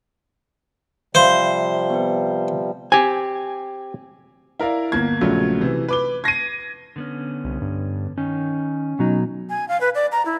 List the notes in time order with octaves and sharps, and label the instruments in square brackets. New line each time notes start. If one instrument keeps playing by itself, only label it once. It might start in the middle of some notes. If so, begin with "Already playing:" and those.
[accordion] C3 F3 G3 [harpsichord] C5 [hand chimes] E5 F5 B5
[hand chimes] B3 F4 B4
[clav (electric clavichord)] C4 G4 [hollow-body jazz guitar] G#5
[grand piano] E4 A#4 D5 F5
G1 A#3 G#6
A#1 C#3 F3 F#3 A3
C3 E3
B4 D6 G7
G#6 A#6 C7 D#7
[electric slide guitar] D3 B3 C#4
[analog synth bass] C2
G2
[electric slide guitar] D#3 D#4 [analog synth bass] C#4
[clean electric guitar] B2 F#3 D#4
[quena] G#5
F5
B4
D5
A#5
E4